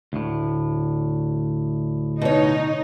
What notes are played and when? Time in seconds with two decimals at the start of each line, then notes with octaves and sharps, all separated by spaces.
0.13 D2 A2
2.21 B2 D#4 C#5